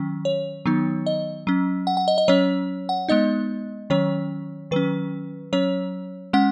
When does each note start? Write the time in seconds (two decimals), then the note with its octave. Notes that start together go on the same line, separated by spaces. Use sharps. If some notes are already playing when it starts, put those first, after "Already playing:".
Already playing: D#3 F#3 C#4
0.25 C#5
0.66 D#3 F#3 B3 D#4
1.06 D#5
1.47 F#3 C#4
1.87 F#5
1.97 F#5
2.08 D#5
2.18 D#5
2.28 F#3 C#4 C#5
2.89 F#5
3.08 G#3 B3 D#4 D#5
3.90 D#3 F#3 C#4 C#5
4.71 D#3 F#3 C#4 B4
5.53 F#3 C#4 C#5
6.33 G#3 C#4 F#5